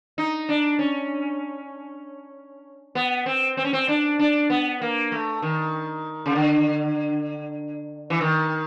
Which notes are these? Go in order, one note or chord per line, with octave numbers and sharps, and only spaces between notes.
D#4
D4
C#4
B3
C4
C4
C#4
C4
D4
D4
B3
A#3
A3
D#3
C#3
D3
E3
D#3